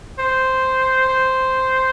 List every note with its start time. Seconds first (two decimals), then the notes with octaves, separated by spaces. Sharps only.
0.19 C5
1.08 C5